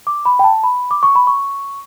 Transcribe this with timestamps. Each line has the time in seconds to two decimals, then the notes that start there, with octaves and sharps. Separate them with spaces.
0.07 D6
0.25 B5
0.39 G5
0.44 A5
0.64 B5
0.91 D6
1.03 C#6
1.15 B5
1.27 C#6